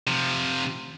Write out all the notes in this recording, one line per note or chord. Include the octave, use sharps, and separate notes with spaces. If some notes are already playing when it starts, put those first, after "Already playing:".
C3 F3